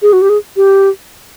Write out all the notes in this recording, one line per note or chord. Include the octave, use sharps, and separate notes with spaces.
G#4
F#4
G4
G#4
G4